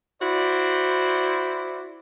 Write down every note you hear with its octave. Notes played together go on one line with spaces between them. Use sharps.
E4 F#4 C5 D5